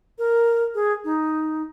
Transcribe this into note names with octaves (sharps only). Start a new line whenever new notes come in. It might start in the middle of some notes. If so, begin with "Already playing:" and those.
A#4
G#4
D#4